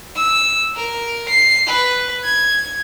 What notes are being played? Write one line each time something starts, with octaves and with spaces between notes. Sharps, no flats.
E6
A#4
C7
B4
G#6